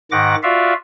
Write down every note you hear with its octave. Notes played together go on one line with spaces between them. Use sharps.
G#2 D#3 F#5 D6 A#6
F4 F#4 D5 E5 F5